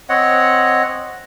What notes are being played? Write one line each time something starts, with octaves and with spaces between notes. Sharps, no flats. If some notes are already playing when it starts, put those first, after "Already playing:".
C4 C#5 D#5 F#5